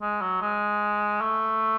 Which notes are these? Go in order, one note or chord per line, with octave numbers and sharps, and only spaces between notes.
G#3
F#3
G#3
A3